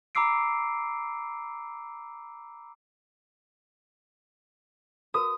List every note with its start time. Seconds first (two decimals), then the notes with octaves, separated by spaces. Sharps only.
0.15 A#5 B5 D6 E6 C7 D7
5.14 F#4 A#4 B4 D#6